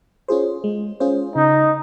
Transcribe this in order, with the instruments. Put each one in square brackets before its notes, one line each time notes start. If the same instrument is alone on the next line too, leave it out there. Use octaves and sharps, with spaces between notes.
[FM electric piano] C#4 F4 G#4 C5
G#3
C#4 F4 G#4 C5
[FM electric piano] C#3 [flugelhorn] D#4